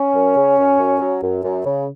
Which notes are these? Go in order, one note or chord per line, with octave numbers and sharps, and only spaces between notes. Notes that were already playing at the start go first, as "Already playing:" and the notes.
Already playing: C#4
F#2
C#3
F#2
F#2
F#3
F#2
F#2
C#3